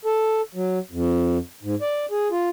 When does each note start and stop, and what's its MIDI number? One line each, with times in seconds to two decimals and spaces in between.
0.05 0.41 69
0.55 0.79 54
0.92 1.38 41
1.63 1.75 44
1.82 2.06 74
2.11 2.28 68
2.31 2.49 65